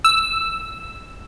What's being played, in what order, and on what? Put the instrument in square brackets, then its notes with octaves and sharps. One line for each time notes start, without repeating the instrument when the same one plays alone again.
[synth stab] E6